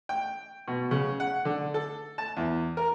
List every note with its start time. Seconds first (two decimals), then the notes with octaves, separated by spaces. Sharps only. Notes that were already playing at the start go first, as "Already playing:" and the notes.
0.09 G5
0.68 B2
0.91 C#3
1.20 F#5
1.45 D3
1.74 A4
2.18 A5
2.37 E2
2.77 A#4